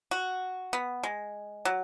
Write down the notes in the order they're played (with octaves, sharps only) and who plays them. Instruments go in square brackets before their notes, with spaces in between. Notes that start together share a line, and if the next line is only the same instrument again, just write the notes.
[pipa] F#4
B3
G#3
F#3